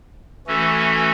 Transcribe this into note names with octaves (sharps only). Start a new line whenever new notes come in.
E3 A3 C#4 F#4 A4